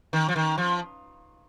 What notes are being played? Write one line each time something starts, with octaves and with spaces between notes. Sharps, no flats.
D#3
F3
D#3
F3